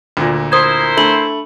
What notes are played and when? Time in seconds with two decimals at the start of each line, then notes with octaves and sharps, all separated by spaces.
0.17 D2 A#2
0.52 E4 A#4 C5 D#6 G#6
0.97 A3 D4 B5 F#7